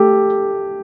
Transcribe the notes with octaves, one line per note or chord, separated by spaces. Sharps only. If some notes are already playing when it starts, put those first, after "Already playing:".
Already playing: A3 G4 A4